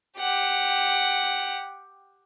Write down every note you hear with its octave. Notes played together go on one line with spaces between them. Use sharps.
G4 F#5